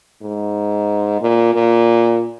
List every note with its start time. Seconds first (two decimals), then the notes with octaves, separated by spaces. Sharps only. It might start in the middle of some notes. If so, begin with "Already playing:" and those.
0.23 G#2
1.21 A#2
1.54 A#2